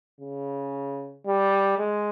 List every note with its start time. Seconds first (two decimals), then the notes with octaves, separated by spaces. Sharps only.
0.21 C#3
1.26 G3
1.79 G#3